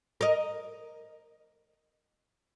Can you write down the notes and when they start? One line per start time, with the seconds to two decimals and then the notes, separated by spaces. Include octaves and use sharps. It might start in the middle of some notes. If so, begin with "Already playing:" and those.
0.21 A#4 D#5